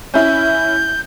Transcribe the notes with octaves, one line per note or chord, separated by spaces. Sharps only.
C#4 E4 G6